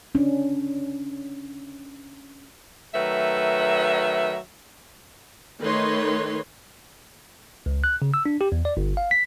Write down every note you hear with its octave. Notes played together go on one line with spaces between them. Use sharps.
C#4 D4
D#3 F#3 A3 B4 E5
D#3 A3 D#4 B4 C#5 C6
C#2
F#6
C#3
E6
D4
G4
E2
D5
G1
F5
B6